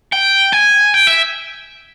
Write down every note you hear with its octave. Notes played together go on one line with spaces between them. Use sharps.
G5
G#5
G5
E5